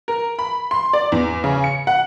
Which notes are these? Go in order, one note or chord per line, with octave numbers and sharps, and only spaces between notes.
A#4
B5
C6
D5
E2
C#3
C#7
F#5